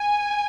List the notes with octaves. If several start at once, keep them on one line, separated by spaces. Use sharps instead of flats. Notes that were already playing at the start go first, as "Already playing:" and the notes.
Already playing: G#5